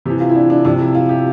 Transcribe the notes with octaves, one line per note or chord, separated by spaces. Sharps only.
C3 E3 G4
F4
E4
D4
D4
C3 F3 D4
E4
F4
G4